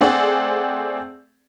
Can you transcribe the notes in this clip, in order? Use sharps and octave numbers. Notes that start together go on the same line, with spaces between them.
A3 C4 G#4 D5 F#5